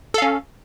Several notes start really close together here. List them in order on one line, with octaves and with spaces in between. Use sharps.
A4 F5 C#4